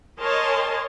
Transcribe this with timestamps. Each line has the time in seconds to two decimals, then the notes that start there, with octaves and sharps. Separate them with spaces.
0.19 A#4 C#5 D#5 G#5 A5 C6